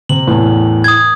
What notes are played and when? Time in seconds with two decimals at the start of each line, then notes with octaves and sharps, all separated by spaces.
0.09 C3 F#7
0.27 E2 A2
0.84 D#6 G#6